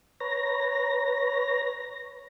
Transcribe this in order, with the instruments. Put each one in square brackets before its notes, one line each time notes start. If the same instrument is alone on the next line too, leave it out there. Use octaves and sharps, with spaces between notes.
[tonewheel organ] B4 C#5 A#5 A#6